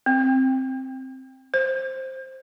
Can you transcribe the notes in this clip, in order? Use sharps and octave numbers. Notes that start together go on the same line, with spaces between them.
C4
C5